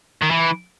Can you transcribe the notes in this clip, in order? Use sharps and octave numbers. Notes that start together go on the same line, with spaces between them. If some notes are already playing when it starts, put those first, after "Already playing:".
D#3
E3